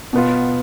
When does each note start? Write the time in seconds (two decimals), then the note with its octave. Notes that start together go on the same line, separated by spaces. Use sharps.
0.13 B2 B3 F4